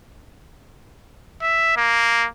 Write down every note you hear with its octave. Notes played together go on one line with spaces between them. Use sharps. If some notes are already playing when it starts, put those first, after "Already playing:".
E5
A#3